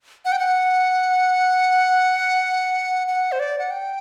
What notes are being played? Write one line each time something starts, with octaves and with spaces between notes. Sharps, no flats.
F#5
G5
F#5
F#5
C5
D5
F#5
G5